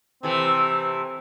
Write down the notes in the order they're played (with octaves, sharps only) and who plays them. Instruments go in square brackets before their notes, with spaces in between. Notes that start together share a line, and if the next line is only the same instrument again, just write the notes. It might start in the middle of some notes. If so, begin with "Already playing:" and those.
[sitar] C3 E3 A3 [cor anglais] C4